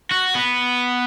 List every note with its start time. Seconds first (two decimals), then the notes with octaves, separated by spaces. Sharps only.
0.11 F#4
0.35 B3